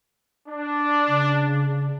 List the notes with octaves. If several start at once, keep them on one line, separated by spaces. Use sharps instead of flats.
D4
C#3